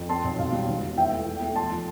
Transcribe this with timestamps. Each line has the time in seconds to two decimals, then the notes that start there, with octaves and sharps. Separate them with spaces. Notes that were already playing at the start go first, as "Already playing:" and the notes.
Already playing: F2
0.09 C4 A5 C6
0.24 B1
0.39 B1 F5
0.52 G3
0.68 E1
0.82 E1
0.96 E3 E5 G5
1.11 A3
1.26 E2
1.41 A3
1.56 F3 A5 C6
1.70 F3